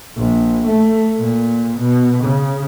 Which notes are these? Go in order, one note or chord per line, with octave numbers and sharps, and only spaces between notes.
A#1
A3
A#2
B2
C#3